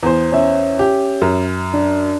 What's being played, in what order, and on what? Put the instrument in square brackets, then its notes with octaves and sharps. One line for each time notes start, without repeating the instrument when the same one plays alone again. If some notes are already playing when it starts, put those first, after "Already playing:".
[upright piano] E2 C5
[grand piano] C#4 E5
[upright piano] G4
F#2
[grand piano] D4